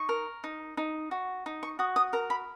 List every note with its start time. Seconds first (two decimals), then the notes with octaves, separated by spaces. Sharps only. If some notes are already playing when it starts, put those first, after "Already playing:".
Already playing: D#4 C#6
0.09 A#4
0.44 D#4
0.77 D#4
1.11 F#4
1.46 D#4
1.63 C#6
1.79 F#4 D#6
1.96 D#6
2.13 A#4 A#5
2.30 B5